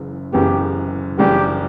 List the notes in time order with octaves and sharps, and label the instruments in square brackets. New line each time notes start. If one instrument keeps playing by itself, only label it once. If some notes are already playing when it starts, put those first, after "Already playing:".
Already playing: [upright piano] F#1 F#2 C#3 E3
[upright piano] F#1 F#2 C#3 E3 B3 [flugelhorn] G4
[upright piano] F#1 F#2 E3 G3 D4 [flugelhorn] G4